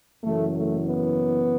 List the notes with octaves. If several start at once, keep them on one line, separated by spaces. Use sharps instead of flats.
F#1 F#2 E3 A3
A3
B3